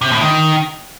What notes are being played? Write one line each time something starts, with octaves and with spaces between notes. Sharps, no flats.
C3
A2
D#3